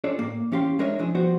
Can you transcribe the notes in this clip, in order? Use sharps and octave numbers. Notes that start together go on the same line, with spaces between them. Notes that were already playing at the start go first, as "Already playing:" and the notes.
D4 F4 G#4 A4 C#5 D5
A2 A#3
E2 C#4 G4 F5 C6
G#3 D4 A#4 C#5 D#5 E5
B1 F3 D4 E4 G#4
F3 G3 B3 F#4 C5